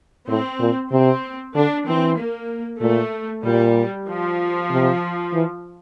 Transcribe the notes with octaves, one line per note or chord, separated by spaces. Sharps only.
A2 C4
A#2
C3 C4
D3 D4
E3 C4
A#3
A#2 A3
A#2 G3
F3
C3
E3